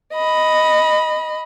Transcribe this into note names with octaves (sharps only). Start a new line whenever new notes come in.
D#5 B5